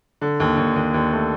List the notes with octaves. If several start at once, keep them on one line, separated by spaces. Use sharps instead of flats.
D3
D#2
D#2
D#2
D#2
A3